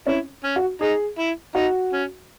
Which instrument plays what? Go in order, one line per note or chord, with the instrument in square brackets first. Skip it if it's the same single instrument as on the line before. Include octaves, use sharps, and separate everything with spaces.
[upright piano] C#4 [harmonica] E4
[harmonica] C#4
[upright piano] F#4
[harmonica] D#4 [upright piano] G#4
[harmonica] E4
[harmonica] D#4 [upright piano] F#4
[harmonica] C#4